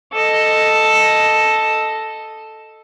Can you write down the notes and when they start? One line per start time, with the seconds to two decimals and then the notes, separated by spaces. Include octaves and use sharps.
0.13 A4 D#5